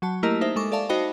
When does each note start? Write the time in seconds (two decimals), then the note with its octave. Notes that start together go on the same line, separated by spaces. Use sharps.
0.02 F#3 F#4 A5
0.23 A3 A#3 E4 G4 A#4 D#5
0.41 D#4 C5 E5
0.56 G#3 A4 C#6 D6
0.72 A4 D5 E5 F5 A5
0.89 D#4 F#4 C5 D#5 G5 B5